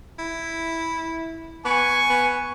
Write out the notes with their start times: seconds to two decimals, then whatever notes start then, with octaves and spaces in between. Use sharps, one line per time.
0.19 E4
1.65 B3 G#5 C#6
2.10 B3